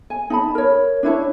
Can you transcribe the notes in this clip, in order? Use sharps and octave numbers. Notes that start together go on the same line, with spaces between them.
G#5
D#4 A5 B5
A#4 C#5
D4 E4 C#5 A5